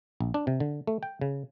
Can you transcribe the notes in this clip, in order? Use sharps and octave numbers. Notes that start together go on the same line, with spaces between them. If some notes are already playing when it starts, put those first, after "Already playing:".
A#1
D4
C3
D3
A3
G5
C#3